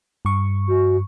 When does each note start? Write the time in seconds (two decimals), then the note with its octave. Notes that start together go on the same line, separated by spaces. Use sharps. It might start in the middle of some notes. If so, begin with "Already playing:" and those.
0.25 G2 C#6
0.69 F#4